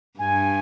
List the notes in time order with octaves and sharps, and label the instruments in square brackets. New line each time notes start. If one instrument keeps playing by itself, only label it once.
[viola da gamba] G2 [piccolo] G#5